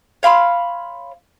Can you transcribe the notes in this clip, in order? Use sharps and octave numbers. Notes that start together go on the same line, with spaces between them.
C#5 F5 B5 C6